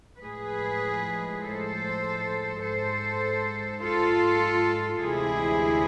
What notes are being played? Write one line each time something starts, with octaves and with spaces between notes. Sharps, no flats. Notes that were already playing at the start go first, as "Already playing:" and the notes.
A2 F3 G#3 G#4 B4
A4 C5
G#2 G#3 A4 C5
F4 A4
D2 C3 E3 G#3 E4 G#4